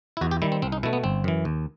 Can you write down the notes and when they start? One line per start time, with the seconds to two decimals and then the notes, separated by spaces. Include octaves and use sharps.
0.17 E4
0.21 E2 F#4
0.31 G4
0.42 D#3 G3 E4
0.52 C4
0.62 C2 C4
0.72 D#4
0.83 B2 A3 E4
0.93 B3
1.04 G1 C4
1.24 F#2 E3
1.45 D#2